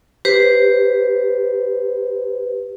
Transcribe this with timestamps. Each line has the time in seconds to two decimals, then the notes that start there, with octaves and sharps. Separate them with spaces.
0.25 G4 B4 C5